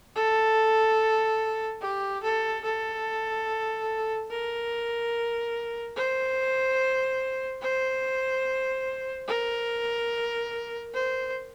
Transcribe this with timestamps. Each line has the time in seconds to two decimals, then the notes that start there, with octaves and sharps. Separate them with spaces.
0.15 A4
1.81 G4
2.23 A4
2.64 A4
4.31 A#4
5.96 C5
7.62 C5
9.28 A#4
10.94 C5